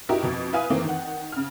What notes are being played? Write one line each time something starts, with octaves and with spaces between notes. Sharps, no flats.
D#4 E4 F#4 G4 A#4
F2 B2
E4 B4 F5 G#5 D#6
D#3 E3 A3 A#3 C4
D#3 F#5
C#3 F6